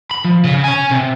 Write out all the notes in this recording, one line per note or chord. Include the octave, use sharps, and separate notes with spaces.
B5
F3
C#3
C#5 G#5
C3